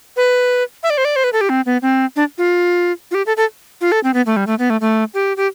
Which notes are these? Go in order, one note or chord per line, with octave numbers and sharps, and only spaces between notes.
B4
E5
D5
C5
D5
C5
B4
A4
G4
C4
B3
C4
D4
F4
F4
G4
A4
A4
F4
A4
C4
B3
A3
G3
A3
B3
A3
A3
G4
G4